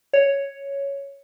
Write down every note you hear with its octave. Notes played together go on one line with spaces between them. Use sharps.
C#5